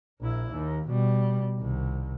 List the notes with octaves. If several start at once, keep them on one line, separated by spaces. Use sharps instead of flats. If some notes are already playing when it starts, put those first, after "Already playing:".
A#1 E4
D#2
B2 G3
C2 D#3